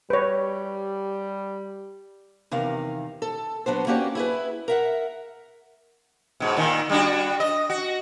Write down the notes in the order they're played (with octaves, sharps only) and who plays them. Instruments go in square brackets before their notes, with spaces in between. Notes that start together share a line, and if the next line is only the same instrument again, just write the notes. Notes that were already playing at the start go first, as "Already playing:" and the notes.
[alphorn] G3 [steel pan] B4 C#5
[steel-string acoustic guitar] E2 C3 D#3 F5
A4
F#3 B3 D4 C5
A#3 C#4 F#4 G4 D5
E4 G#4 B4
A#4 E5 F#5
[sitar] G#2 B2
A#2 D#3
G3 D4 F#4
D#5
F#4